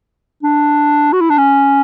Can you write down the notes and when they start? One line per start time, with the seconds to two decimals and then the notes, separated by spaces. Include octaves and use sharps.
0.43 D4
1.13 F#4
1.20 E4
1.30 D4
1.38 C#4